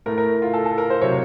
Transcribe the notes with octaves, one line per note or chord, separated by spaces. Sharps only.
A2 A3 A#4
A#4
F4
A4
A4
A#4
C5
C3 F#3 C#5